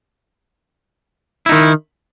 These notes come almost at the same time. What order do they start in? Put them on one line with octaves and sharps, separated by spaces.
E4 D#4 D#3